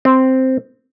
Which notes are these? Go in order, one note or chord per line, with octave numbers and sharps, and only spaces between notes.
C4